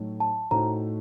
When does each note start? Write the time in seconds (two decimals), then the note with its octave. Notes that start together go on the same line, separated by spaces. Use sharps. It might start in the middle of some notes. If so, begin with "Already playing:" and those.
Already playing: A2 F#3 A3 D#4
0.20 A5
0.51 A2 A3 D#4 F#4 C5 A#5